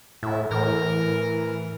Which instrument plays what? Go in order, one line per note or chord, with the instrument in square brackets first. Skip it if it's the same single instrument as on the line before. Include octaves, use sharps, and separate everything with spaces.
[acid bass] A2 [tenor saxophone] E4
[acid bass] A2 [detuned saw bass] E3 [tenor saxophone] A#4